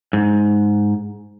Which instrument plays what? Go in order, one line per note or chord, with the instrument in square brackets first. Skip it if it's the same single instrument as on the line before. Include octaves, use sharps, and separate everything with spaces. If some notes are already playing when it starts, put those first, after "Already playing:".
[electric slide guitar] G#2